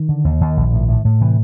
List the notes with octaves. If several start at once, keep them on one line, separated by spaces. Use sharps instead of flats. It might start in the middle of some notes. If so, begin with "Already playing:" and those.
Already playing: D#3
D3
D#2
D#2
A#1
A2
A2
A2
C3 E3